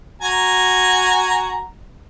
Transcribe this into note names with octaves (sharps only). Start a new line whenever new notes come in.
F#4 G#5 A#5